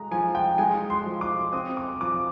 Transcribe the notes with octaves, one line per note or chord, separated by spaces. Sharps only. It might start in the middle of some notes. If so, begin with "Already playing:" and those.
Already playing: G#3 A#5
F3 G#5
G5
G#3 G#5
C6
F3
D6
C4 D#6
D6
F3 D6